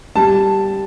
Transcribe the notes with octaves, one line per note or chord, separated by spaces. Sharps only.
G3 A5